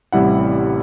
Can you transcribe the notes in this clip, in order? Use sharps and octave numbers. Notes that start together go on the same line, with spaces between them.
A1 C3 G3 E4 F#5